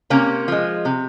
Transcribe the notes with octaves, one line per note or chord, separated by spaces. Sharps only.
C3 A#3 C#4
F3 G#3
C3